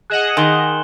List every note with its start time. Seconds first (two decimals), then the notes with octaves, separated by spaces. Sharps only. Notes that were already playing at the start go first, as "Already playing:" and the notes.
0.10 G#4 D#5 F#5 F#6 E7 F#7
0.37 D#3 G#5 C6 G7